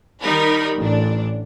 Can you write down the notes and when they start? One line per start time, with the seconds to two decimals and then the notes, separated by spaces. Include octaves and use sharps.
0.22 D#3 G3 D#4 A#4 B5
0.79 A1 D4